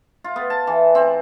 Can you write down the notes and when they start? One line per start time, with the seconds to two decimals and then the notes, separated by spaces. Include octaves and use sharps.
0.24 F4
0.36 B3
0.50 A5
0.67 E3
0.95 C4